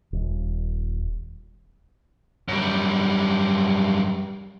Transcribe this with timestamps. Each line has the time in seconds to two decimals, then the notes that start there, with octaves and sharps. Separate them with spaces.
0.13 D#1
2.49 F#2 G3